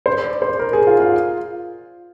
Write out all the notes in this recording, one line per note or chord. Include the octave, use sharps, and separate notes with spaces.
C5
D5
C5
A#4
G#4
F4
F4